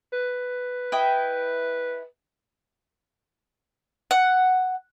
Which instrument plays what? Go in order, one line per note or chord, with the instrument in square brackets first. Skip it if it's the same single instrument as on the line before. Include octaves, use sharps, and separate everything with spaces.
[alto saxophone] B4
[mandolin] E4 D#5 G5
F#5